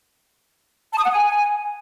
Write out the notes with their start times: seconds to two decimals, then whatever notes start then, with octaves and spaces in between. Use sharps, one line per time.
0.91 A5
0.98 D#6
1.05 F#5
1.11 G#5